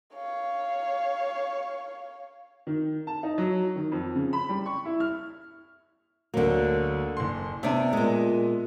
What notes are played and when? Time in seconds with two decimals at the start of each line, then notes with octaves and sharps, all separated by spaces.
0.15 C#5 F5
2.67 D#3
3.07 A5
3.23 D#4
3.38 F#3
3.76 D#3
3.92 F2
4.15 C#3
4.33 B5
4.49 G3
4.66 C#6
4.85 E4
5.00 F6
6.34 D2 D3 F#3 A#3
7.17 F#1 C6
7.63 C3 B3 D4 E5
7.93 A#2 G#3